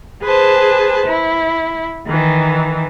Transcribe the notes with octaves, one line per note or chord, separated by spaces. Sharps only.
G#4 B4 C5 A5
E4
D#3 E3